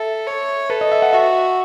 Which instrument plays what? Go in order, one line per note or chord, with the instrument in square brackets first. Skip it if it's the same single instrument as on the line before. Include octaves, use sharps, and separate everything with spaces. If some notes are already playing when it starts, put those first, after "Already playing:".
Already playing: [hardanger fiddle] A4 [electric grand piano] E5
[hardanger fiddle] C#5
[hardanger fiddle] A4 [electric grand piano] B4
[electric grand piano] D#5
E5
F#5
[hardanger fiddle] F#4 [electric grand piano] E5